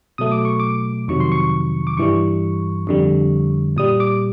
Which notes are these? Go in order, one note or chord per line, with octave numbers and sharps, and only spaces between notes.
B2 F#3 A3 D#6
D6
C#6
D6
F2 C3 D#3 F#3 C#6
C6
C#6
D6
G2 E3 G3 C#6
F2 D3 G3
A#2 G3 D#6
D6